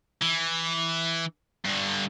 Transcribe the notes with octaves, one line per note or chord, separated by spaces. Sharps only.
E3
G2 D3